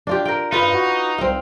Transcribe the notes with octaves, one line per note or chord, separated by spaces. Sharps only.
D4 F4 G4
A#4 G5
G2 D#4 F4 B4
F#4
C2 C4 F5